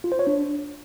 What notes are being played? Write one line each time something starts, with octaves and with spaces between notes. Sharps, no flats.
F4
C5
C#5
D4